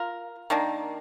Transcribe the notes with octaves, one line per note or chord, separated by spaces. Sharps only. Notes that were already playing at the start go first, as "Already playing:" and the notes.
Already playing: F4 A#4
D#3 A#3 D4